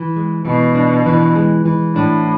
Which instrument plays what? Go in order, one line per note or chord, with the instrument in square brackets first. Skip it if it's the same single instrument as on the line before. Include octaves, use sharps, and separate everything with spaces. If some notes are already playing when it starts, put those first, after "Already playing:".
Already playing: [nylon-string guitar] E3
G#3
[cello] B2 [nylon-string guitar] E3
[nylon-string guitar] D4
E3
G#3
E3
[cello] A2 [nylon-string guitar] D4